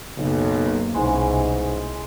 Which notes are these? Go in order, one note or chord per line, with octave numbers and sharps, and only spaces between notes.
B1 F#2 C#3 A#3
C2 G#2 B2 E3 G#3 C#4